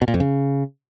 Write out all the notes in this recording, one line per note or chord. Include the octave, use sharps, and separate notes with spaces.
B2
A#2
F2
C#3